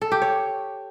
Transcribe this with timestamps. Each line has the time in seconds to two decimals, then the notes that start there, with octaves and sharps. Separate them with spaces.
0.02 A4
0.12 G4
0.22 C#5